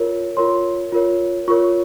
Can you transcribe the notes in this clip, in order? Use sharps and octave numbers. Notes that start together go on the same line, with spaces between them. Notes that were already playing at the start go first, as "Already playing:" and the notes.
Already playing: F4 A#4 C#5
F4 A#4 C#5 C6
F4 A#4 C#5
F4 A#4 C#5 C#6